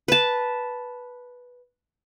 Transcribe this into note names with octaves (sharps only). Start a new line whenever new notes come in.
B4 A5